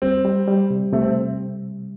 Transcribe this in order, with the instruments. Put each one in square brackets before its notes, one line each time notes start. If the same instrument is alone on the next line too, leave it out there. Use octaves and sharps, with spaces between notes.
[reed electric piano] G3 [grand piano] C4
[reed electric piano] G3
G3
C3
[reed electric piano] C3 [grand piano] A3
[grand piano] C4